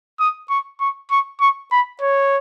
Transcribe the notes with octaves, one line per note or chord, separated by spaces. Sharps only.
D#6
C#6
C#6
C#6
C#6
B5
C#5